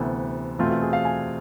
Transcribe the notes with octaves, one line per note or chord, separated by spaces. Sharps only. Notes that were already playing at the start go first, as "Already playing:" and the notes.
Already playing: D2 C3 E3 B3 A4
E2 B2 A3 C4 F4
F4
G#4
F5
G#5